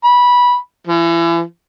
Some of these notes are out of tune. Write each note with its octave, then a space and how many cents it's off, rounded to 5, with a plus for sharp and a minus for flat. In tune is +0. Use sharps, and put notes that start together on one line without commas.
B5 -15
E3 +35